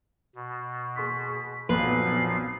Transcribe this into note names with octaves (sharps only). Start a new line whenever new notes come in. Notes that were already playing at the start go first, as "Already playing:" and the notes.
B2
G#4 C6 C#6 B6
B1 F2 A#2 F3 B4 F#5 C7